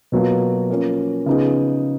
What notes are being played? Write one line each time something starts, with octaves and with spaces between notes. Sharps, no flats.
B2 F#3 A#3 F4
F3 A#3 C#4
C#3 F3 B3 D#4 G#4